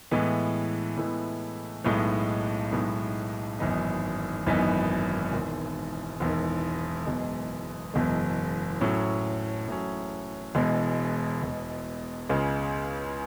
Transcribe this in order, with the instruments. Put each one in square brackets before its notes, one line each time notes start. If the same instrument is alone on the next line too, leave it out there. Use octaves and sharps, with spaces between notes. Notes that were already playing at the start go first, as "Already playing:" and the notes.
[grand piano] A2 E3 G#3 B3
A2 E3 G#3 B3
B1 A2 G#3 B3 D#4
B1 A2 G#3 B3 D#4
G#1 F#2 E3 B3 D#4
G#1 F#2 E3 B3 D#4
E1 E2 D#3
E1 E2 D#3
F#1 E2 B2 G#3
F#1 E2 B2 G#3
A2 F#3 C#4
A2 F#3 C#4
E1 E2 B2 G#3
E1 E2 B2 G#3
C#2 C#3 G#3